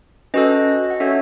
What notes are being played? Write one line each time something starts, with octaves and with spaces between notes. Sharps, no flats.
C#4 F#4 A4 B4 D#5
F#5
C#4 F#4 A4 C#5 E5